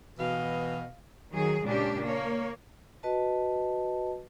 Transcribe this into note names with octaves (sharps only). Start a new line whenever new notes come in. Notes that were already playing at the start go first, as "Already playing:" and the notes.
B2 E3 D#5 F5
D#3 F#3 G#4
A#2 C#3 G#3 C#4 D4 G4
A#3 C#5
F#4 B4 D#5 A5